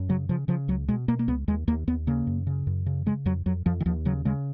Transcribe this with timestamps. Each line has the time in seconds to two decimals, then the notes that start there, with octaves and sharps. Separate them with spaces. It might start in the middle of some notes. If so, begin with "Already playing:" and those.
Already playing: F#2
0.09 C#3 F#3
0.29 C#3 F3
0.48 C#3 F3
0.68 C#2 F#3
0.88 B2 G#3
1.08 B2 A#3
1.19 A#3
1.28 C#2 B3
1.48 D#2 G#3
1.67 D#2 A#3
1.87 D#2 B3
2.07 C#3 A#3
2.27 F#2
2.47 C#3
2.67 F#2
2.86 C#3
3.06 C#3 G#3
3.26 F2 F#3
3.46 F2 F#3
3.66 F2 F3
3.80 D#3
3.86 D#2 F3
4.05 C#3 F#3
4.25 C#3 G#3